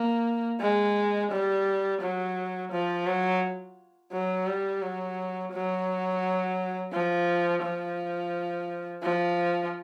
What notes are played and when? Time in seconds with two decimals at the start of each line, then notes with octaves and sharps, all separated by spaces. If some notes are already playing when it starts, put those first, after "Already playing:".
Already playing: A#3
0.60 G#3
1.31 G3
2.01 F#3
2.71 F3
3.06 F#3
4.12 F#3
4.47 G3
4.82 F#3
5.52 F#3
6.93 F3
7.62 F3
9.03 F3